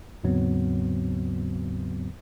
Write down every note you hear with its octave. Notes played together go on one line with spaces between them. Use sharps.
D#2 G#2 C#3 F#3 B3 C4